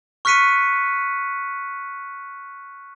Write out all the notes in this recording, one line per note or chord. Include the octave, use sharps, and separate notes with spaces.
C#6 F6 F#6 B6 C#7 D#7